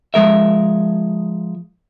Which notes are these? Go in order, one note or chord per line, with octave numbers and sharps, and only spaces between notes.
F3 G#3 A#4 E5